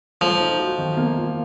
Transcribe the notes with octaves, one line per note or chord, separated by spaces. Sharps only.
F3 A3
D#4
F#4
D#3
A#3
F4